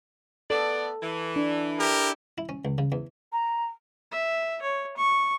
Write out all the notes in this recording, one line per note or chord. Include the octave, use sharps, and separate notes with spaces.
B3 A4 D5
E3
D4
E4 G4 A#4
E4
C#4
C#2
C#3
E2
A#5
E5
C#5
C#6